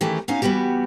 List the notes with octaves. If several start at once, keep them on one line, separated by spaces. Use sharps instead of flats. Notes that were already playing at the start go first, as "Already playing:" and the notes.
D#3 E3 A3 C#4 G4 G#4
B3 C#4 D#4 F#4 F5 G#5
E3 G3 B3 F#4 G4